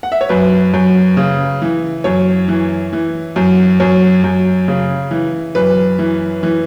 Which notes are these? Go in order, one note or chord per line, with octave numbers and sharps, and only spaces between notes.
F#5
E5
C#5
F#2 B4
F#2
C#3
E3
F#2 C#5
E3
E3
F#2
F#2 C#5
F#2
C#3
E3
F#2 B4
E3
E3